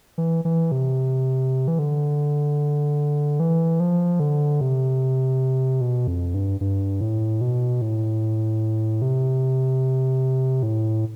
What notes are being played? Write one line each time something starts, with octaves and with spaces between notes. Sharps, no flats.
E3
E3
C3
E3
D3
E3
F3
D3
C3
B2
F2
G2
G2
A2
B2
A2
C3
A2